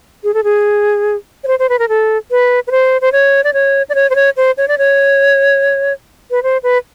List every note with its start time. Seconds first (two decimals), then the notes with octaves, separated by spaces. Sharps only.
0.24 G#4
0.34 A4
0.44 G#4
1.44 C#5
1.47 C5
1.59 C5
1.69 B4
1.79 A#4
1.89 A4
2.31 B4
2.67 B4
2.71 C5
3.01 C5
3.12 C#5
3.44 D5
3.54 C#5
3.89 D5
3.95 C#5
4.10 C5
4.15 C#5
4.37 C5
4.57 C#5
4.68 D5
4.78 C#5
6.31 B4
6.43 C5
6.63 B4